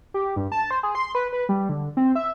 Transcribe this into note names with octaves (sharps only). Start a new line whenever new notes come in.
G4
G2
A5
C5
G#4
C6
B4
B4
G3
D3
C4
E5